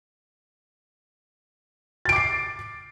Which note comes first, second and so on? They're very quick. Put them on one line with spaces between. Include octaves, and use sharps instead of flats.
A6 D7 D6 C7